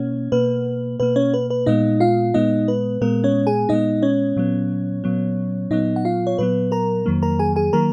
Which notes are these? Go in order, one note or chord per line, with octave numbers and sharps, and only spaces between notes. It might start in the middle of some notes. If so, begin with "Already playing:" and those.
Already playing: B2 A#3 C#4 C#5
B2 A#3 B4
B2 A#3 B4
C#4 C#5
B4
B4
A#2 G#3 B3 D#4 D#5
F4 F5
A#2 G#3 B3 D#4 D#5
B4
A#2 G#3 B3 A#4
C#4 C#5
G#4 G#5
A#2 G#3 B3 D#4 D#5
C#4 C#5
A#2 F#3 B3
A#2 F#3 B3
A#2 F#3 B3 D#4 D#5
F#5
F4 F5
C#5
A#2 F#3 B3 B4
A#4 A#5
F2 D#3 F#3 A#3
A#4 A#5
G#4 G#5
G#4 G#5
D#3 F#3 A#3 A#4 A#5